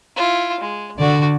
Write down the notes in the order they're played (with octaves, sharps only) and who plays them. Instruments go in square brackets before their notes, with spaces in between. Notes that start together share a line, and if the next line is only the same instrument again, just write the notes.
[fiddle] E4 F4
G#3
[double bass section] D3 [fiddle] F#4 D5